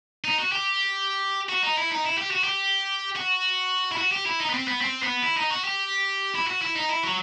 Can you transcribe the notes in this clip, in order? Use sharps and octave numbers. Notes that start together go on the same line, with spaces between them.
D#4
F#4
G4
F#4
D#4
E4
D#4
E4
G4
F#4
G4
F#4
E4
F#4
G4
E4
D#4
B3
C4
B3
C4
B3
E4
D#4
F#4
G4
E4
F#4
E4
D#4
E4
F#3